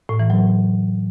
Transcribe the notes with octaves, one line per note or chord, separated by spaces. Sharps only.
A2
E3
F#3